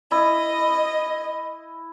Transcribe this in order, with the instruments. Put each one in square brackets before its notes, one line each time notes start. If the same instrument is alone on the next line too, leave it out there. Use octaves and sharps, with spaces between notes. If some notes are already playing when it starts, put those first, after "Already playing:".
[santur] E4 [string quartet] D#5